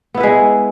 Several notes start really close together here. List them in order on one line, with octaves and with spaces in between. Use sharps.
B3 E4 B4 G#3